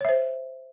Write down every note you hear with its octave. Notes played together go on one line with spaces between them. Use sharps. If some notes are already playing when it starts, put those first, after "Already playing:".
C5 C#5 E5